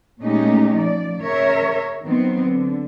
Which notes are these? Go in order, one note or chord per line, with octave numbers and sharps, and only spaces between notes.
A#2 G#3 A3 C#4 D#4 G4
F3 D5
C#3 A#4 C#5 E5
D#3 F#3 B3 C4
D3